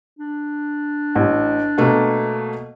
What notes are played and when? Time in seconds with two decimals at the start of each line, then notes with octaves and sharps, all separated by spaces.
0.19 D4
1.15 A1
1.78 B2 A3 A#3